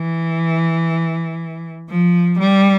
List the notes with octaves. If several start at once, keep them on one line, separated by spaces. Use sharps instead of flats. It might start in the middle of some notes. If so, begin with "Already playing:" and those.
Already playing: E3
F3
G3